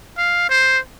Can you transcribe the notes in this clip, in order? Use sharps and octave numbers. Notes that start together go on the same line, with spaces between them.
F5
C5